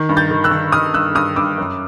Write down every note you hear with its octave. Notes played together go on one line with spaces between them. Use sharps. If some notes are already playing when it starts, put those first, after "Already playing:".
Already playing: D#3
G2
G6 A6
D#3
E6 F#6
D#3
D#3 D#6 F6
G2 E6 F#6
G2 D#6 F6
G2 D6 E6
F#2